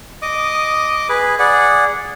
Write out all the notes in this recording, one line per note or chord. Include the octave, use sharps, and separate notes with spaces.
D#5 D6 D#6
G#4 B4
G#4 D5 F#5